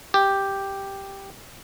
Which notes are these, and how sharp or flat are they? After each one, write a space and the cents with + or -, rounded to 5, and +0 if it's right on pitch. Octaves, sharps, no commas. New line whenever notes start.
G4 +0